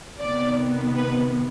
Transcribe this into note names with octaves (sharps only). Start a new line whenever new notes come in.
C3 D#3 B3 D5
B4